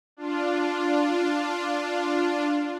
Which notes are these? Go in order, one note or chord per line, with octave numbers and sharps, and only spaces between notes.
D4 F4